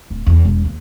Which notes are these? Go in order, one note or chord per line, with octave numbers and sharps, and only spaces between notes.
D1
E2
E1
D#2